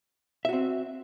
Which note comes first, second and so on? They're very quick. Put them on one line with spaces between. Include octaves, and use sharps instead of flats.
E5 F#4 C4